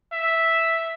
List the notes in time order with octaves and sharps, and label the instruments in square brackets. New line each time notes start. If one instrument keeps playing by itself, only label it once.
[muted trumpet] E5